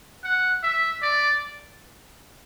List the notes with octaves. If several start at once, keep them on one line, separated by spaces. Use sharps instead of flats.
F#5
E5
D5